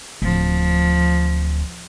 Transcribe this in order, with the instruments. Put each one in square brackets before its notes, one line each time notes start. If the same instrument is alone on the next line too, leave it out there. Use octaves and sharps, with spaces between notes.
[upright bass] D1 [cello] F3